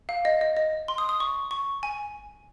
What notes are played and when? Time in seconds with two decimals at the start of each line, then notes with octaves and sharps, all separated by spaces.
0.09 F5
0.25 D#5
0.41 D#5
0.57 D#5
0.88 C6
0.98 D#6
1.09 D#6
1.20 C#6
1.51 C#6
1.83 G#5